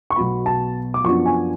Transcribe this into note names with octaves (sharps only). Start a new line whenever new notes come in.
C#6
B1 B2 F#3 B3 B5
A5
D6
F#2 F3 B3 D4 C#6
G#5